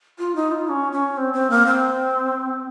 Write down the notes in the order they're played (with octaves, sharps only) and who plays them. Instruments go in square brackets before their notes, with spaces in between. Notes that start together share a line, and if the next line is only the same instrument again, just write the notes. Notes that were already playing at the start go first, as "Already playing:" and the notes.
[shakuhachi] F4
D#4
F4
C#4
C#4
C4
C4
A#3
C4